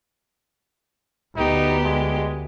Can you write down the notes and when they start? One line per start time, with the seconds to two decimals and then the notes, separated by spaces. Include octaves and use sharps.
1.36 D2 B3 D#4 G4
1.84 G#3